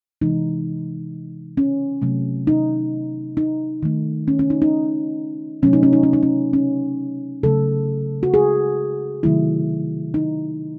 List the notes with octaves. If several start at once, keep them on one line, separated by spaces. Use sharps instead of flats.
C3 E3 G#3 D#4
C#4
C3 F#3 A3
D#4
D#4
D#3 A3
C#4
C#4
D#4
D#4
C3 F#3 A3 C#4
D#4
C#4
D#4
C#4
D#4
C#4
C#4
C#3 F#3 A3 A4
F#4
G#4
C3 D#3 F#3 A3 E4
D#4